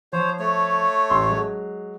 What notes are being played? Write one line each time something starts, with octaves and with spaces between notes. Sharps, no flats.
F3 C5 C#5
A3 C#5
A1 C6 E6
F#3 G#3